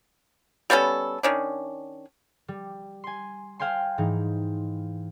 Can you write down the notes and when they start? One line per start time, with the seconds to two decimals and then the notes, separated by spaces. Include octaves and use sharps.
0.70 G3 B3 C#4 A4
1.23 D#3 C#4 D4
2.48 G3
3.04 G#5 C6
3.60 C5 F5 G5 G#5 C6
3.98 G#2 E3 D#4